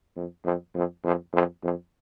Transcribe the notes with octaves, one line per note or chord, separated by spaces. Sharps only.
F2
F2
F2
F2
F2
F2